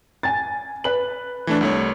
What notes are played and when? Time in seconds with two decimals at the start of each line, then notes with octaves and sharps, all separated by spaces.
0.23 G#5 A6
0.84 B4 F#7
1.47 E3 A3 D4
1.61 C2 A3 C#5